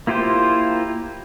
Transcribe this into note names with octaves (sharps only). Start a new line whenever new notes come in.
A#3 E4 F4 G4 C5